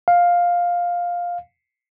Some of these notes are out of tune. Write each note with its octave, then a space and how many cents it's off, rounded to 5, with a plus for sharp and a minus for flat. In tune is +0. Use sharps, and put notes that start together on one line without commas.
F5 +10